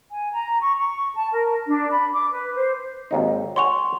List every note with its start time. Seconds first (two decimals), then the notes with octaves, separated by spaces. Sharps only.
0.12 G#5
0.32 A#5
0.61 C#6
0.79 C#6
1.16 A5
1.32 A#4
1.67 D4
1.90 B5
2.13 D6
2.31 B4
2.57 C5
3.11 G#1 D#2 D#4
3.56 C#5 F#5 G#5 C6 C#6 F7